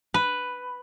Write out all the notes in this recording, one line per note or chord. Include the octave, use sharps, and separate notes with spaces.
B4